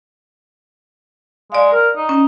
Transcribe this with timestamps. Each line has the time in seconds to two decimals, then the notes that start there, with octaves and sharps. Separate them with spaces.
1.52 G#3 D5 F5
1.72 A#4
1.96 D#4
2.09 C#4